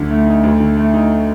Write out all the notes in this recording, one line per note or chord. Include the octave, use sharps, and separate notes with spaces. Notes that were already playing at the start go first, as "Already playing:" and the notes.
Already playing: D2 D3
A3
D#4
D2
D3
A3
D#4